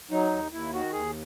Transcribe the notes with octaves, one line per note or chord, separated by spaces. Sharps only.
F#3 D#4
D#2
D#2 E4
D#3 F#4
D#2 G#4